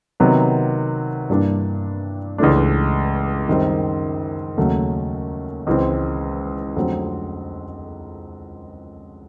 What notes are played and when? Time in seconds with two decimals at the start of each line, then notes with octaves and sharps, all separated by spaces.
0.20 C3 D#3 F#3 B3
1.30 G2 E3 G3 A#3 D4
2.38 C#2 C#3 E3 A3 D4
3.48 F#2 D#3 G3 C4
4.57 D#2 C#3 F#3 A3 C#4
5.67 C#2 C#3 E3 G#3 C4
6.76 F2 D3 F#3 A3 C4